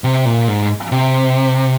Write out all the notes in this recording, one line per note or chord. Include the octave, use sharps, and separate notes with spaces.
C3
A#2
G#2
C3